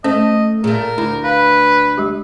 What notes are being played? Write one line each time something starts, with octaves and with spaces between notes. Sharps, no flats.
A3 C#4 C5 D#5
A#2 A3 G#4 A#4
D2 E4
B4 F5
G#3 G4